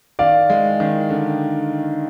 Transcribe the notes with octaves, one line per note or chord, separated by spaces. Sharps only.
D#3 D5 F5
G#3
D#3
D3